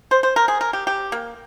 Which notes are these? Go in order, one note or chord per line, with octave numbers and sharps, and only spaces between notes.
C5
C5
A#4
G#4
A#4
G4
G4
A#3